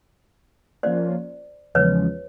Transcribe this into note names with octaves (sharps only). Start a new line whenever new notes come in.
F3 A#3 C#4 F4 C5 D5
E2 C#3 F3 G#3 B4 C#5